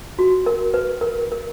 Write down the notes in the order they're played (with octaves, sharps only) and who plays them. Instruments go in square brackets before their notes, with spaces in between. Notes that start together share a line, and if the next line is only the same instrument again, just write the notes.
[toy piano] F#4
A#4
B4
A#4
A#4